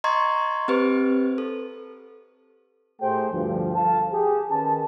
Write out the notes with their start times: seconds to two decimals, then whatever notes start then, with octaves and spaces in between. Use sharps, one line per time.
0.04 D#5 A#5 C6 C#6 G#6
0.68 C4 G4 B4 C5
1.38 A4
3.01 A2 A3 G4 G#4 C5 G5
3.32 D2 G2 F3
3.75 A4 F5 A5
4.11 G4 G#4
4.50 D#3 C#4 B4 A5